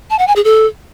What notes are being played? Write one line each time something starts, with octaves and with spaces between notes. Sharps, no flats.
A5
F#5
G#5
G#4
A4